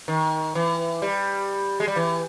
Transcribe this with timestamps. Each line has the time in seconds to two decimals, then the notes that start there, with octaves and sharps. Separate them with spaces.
0.08 D#3
0.55 E3
1.02 G3
1.80 G#3
1.88 G3
1.96 E3